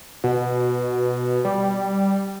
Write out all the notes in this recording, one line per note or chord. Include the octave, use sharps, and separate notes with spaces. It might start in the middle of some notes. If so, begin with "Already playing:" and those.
B2
G3